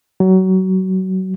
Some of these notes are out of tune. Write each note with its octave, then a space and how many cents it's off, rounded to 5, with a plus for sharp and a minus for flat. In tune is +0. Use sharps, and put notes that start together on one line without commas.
F#3 +25